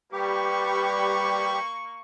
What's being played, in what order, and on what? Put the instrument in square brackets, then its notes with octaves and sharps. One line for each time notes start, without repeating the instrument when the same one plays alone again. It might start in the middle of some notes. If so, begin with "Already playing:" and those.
[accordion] G3 G4 [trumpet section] A#3 C#6 [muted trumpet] B4